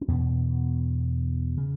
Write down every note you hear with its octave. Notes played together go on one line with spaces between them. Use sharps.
C#4
E2 B2 B3
C#3